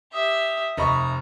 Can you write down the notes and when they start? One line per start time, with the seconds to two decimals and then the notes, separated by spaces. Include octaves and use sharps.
0.13 G4 E5 D#6
0.77 F1 D5 D#5 A#5 B5 C#6